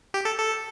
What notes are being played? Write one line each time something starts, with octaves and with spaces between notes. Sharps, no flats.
G4
A4
A4